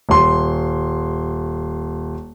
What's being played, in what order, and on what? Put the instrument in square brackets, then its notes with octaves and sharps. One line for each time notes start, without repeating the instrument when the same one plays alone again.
[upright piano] D#1 C6